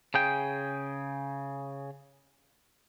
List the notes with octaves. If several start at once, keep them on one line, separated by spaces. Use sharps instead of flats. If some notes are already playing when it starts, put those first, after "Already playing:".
C#3 G#4 G5